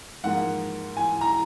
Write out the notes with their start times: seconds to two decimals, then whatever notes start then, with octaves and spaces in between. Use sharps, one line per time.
0.24 G#2 F3 A#3 F#5
0.97 G#5
1.21 A#5